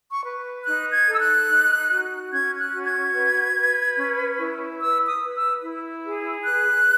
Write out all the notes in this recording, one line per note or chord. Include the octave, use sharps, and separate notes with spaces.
C#6
B4
D#4 F#6
G#6
A4
E6
F#6
D#4
F#4
C#4 G#6
F#6
F#4
G#6
B4
B4
C#4
E4
B4 E6
D#6
B4
E6
E4
G#4
B4 F#6